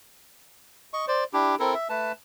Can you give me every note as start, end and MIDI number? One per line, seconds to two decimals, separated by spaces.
0.94 1.05 75
0.94 1.05 85
1.08 1.24 72
1.08 1.24 74
1.33 1.55 62
1.33 1.55 64
1.33 1.55 67
1.60 1.74 60
1.60 1.74 64
1.60 1.74 69
1.60 1.74 70
1.74 1.88 76
1.89 2.12 57
1.89 2.12 71
1.89 2.12 81